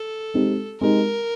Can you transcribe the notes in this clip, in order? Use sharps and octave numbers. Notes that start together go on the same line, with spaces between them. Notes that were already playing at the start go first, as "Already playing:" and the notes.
Already playing: A4
G#3 C4 D#4 G4
G#3 C4 D#4 G4 A#4